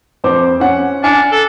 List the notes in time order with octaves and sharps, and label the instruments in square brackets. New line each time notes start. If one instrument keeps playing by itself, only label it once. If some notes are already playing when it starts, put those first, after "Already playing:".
[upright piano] F2 C5 D6
C#4 F#5
[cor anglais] D4 [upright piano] G#5 F6 C#7
[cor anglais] A4